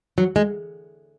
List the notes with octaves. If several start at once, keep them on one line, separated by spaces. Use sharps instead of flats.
F#3
G#3